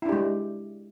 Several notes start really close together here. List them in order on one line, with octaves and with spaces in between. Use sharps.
E4 D4 G4 G#3